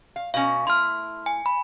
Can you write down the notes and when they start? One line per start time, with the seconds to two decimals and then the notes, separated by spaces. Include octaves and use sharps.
0.16 F5
0.34 B2 C#4 F5
0.67 A3 E4 C6 F6
1.26 G#5
1.46 B5